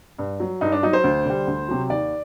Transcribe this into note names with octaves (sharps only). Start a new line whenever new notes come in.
G2
F#3
G2 D#4
D4
F#3 D#4
C5
D2
D3 G3
D2
C3 F#3
D#2 D5